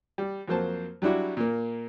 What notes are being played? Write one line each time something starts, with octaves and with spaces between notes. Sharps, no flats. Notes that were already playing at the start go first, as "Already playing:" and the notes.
G3
F2 F#3 A#3 C5 A5
F#3 G3 D4 E4 F#4
A#2 A#3